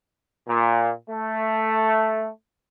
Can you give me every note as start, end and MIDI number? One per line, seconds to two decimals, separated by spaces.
0.48 0.91 46
1.09 2.28 57